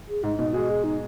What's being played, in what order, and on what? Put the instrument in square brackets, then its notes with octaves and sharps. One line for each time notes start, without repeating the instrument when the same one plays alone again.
[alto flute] G#4
[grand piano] G#2 [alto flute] D#4
[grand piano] B2 [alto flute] D#4
[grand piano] G#3 [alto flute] F#4
[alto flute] G#4
D#4